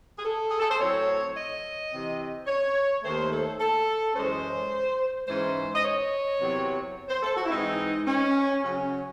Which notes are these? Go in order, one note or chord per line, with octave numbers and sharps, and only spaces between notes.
G#4
A4
G#4
A4
C5
A2 F#3 C4 C#5
D#5
C3 E3 C4
C#5
D#2 D#3 A3 C5
A4
A4
F#2 E3 G#3 C#4 C5
G#2 E3 G#3 C#4 C5
D#5
C#5
E2 C3 F#3 C4
C5
A4
F#4
E4
G#2 E3 G#3 C4 D#4
C#4
C#3 F#3 C#4